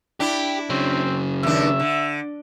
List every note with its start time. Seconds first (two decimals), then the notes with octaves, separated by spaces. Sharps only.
0.20 D4 E4 G4
0.70 C#3 F#3 C4
1.43 D#2 D4 E5
1.79 D3